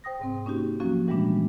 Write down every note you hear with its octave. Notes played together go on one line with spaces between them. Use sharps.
C5 G5 D#6 A#6
G#2 C3 C4
A#3 C#4 D#4 F#4 G4
F3 F#3 A#3 C#4 F#4
A#2 E3 G3 G#3 B3 D4